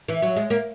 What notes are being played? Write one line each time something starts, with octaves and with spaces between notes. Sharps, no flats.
E3
F#3
G#3
A#3